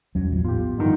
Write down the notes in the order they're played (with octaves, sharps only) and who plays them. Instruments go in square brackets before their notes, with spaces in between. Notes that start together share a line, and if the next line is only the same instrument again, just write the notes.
[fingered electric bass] E2 G3 [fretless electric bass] F#3 C#4
[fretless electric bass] A#1 E3 F3
[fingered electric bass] A2 [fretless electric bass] B3 [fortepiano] F4 G4
[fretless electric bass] G2 [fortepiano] D3 D#3 F3